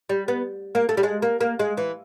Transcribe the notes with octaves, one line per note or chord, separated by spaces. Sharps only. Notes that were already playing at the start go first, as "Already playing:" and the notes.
G3
B3
A#3
A3
G3
G#3
A#3
A#3
G#3
E3